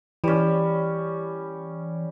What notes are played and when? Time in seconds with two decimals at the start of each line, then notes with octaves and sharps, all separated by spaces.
0.24 E3 G3 C#4